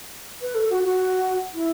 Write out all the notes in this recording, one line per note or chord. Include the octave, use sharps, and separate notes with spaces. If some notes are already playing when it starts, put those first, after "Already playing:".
B4
A4
F#4
F#4
E4